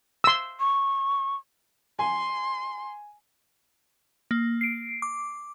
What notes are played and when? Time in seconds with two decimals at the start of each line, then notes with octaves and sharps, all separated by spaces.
0.24 C6 E6
0.60 C#6
1.99 G#5 C6
4.31 A#3
4.61 C7 D7
5.02 D6